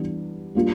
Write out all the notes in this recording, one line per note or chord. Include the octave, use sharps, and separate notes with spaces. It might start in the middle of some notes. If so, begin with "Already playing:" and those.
Already playing: E3 G3 B3 D4
G3 A#3 D4 F4